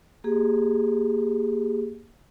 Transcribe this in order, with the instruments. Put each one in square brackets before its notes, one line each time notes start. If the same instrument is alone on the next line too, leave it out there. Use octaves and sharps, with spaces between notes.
[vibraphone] A#3 G4 G#4